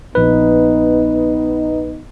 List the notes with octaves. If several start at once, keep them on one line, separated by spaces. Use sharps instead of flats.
A#1 B3 D#4 B4